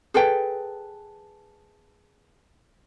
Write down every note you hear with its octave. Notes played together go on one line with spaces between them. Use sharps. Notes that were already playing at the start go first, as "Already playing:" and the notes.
G#4 A4 B4 G5